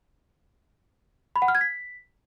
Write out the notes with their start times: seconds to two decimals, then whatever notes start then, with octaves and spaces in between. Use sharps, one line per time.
1.36 B5
1.42 F#5
1.48 F6
1.55 G#6
1.61 B6